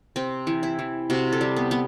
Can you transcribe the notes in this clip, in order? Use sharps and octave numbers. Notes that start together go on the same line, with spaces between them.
C3 C4
E3
E4
E3
C3 F#4
A4
G3
B3
B3